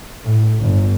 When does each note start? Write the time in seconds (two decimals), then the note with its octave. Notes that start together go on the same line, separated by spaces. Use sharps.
0.24 A2
0.59 G1